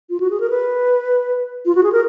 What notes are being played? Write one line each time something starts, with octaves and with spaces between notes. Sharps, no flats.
F4
F#4
G#4
A#4
B4
F4
F#4
G#4
A#4